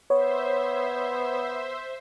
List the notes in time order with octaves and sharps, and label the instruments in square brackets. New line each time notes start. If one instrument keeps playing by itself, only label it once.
[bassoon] B3 [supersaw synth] C5 E5 [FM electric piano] C#5